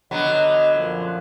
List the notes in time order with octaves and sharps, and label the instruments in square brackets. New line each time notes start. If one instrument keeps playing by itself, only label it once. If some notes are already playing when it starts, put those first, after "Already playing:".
[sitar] D3 F#3 B3 [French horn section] D#5
[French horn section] F#2 A#2 F3